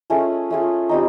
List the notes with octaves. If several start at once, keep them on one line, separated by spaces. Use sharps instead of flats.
A3 C#4 F4 G#4
A3 C#4 F4 G#4
G3 C4 D#4